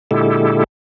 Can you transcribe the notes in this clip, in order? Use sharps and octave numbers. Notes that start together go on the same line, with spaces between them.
A#2 D3 G#3 E4 G4 A4